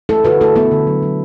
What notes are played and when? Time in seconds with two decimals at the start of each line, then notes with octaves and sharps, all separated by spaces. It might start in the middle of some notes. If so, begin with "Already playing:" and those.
0.09 A3 E4 A4
0.25 D3 F#4 B4
0.41 A3 E4 A4
0.56 A3 B3 E4
0.71 D3
0.87 F#3
1.03 F#3